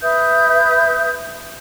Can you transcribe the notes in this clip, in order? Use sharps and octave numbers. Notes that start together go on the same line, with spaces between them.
B4 E5 D#6 G6